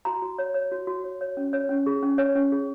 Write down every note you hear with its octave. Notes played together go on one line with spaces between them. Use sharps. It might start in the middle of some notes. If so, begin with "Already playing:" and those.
F#4 A#5
F#4
C#5
C#5
F#4
F#4
C#5
C#5
C#4
C#5
C#4
G#4
C#4
C#5
C#4
G#4